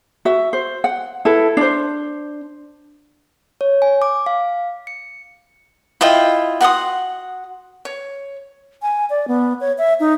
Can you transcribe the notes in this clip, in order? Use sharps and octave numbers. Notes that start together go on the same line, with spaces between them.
F#4 E5
C5
F#5
E4 A4 B4
D4 C5
C#5
G#5
D6
F5
C#7
E4 F4 D#5 G5
F#4 F#5 C6 D#6
C#5
G#5
D5
B3
C#5
E5
D#4